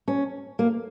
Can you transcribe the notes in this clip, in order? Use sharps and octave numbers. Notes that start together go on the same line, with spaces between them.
C#4
A#3